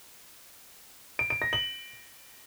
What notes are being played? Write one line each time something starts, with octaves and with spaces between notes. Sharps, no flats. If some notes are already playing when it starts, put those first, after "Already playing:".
D7
D7
A#6
F#7